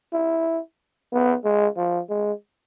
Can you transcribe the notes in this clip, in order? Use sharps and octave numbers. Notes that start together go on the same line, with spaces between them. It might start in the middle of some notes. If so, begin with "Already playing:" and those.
E4
B3
G#3
F3
G#3